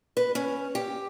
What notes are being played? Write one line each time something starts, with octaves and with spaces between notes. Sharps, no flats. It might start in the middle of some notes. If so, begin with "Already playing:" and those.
B4
C#4
G4